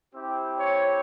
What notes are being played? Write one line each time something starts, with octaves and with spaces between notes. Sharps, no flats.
C4 E4 G4
C#5